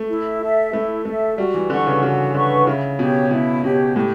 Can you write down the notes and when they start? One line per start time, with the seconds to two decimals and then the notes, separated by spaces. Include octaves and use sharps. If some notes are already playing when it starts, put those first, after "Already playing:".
Already playing: A3
0.09 E4
0.41 A4 E5
0.73 A3 E4
1.05 A3 A4 E5
1.38 G3 F#4
1.54 E3
1.70 D3 B4 F#5 C#6
1.87 C#3
2.02 C#3 F#4
2.34 D3 B4 F#5 C#6
2.66 C#3 E4
2.99 B2 G4 C#5
3.31 B2 E4
3.63 B2 G4 C#5
3.96 A2 G4